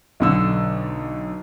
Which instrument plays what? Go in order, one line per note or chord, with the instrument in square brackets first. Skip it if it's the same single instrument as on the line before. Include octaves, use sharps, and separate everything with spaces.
[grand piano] B1 D3 E6